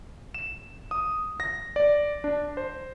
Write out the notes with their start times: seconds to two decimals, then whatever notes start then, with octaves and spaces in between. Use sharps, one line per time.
0.34 E7
0.91 D#6
1.40 A#6
1.76 D5
2.24 D4
2.57 C5